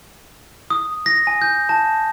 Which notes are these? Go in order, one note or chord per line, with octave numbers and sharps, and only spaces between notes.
D#6
A#6
G#5
G6
A5